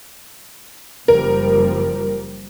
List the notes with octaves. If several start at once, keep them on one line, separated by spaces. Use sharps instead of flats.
F#1 F3 G3 A#4